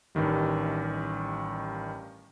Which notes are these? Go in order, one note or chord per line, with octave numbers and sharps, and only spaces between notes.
A1 G2 D#3 G3